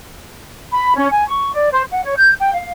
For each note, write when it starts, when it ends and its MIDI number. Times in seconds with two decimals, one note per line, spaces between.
0.71 0.92 83
0.95 1.06 61
1.11 1.24 80
1.27 1.51 85
1.52 1.70 74
1.71 1.83 72
1.91 2.00 78
2.04 2.13 73
2.16 2.32 91
2.40 2.54 79
2.55 2.72 77